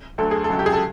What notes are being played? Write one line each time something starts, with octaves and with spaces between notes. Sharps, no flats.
D2 D3 F#3 A4
G#4
A4
C#2 C#3 F#3
G4
G#4
A4